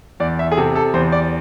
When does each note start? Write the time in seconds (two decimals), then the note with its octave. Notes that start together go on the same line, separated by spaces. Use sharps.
0.20 E2 D5
0.39 E5
0.51 G#4
0.57 C3 A4
0.75 A4
0.94 E2 C5
1.12 D5